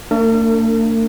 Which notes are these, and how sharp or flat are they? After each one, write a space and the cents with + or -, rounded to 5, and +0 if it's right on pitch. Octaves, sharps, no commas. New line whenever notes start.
A3 +45 D4 +0 A#4 -40